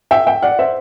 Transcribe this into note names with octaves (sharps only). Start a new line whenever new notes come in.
E5 G5
E5 G5
D5 F#5
C5 E5